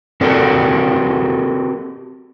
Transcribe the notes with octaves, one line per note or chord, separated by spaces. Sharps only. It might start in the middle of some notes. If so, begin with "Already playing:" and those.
C4 F#4 G4 A4 A#4 D5